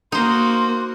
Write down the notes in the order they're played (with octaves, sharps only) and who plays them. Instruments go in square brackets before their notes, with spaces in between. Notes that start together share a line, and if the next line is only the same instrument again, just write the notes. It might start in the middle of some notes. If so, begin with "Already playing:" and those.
[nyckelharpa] A#3 F#4 [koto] D#4 C5 [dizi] C6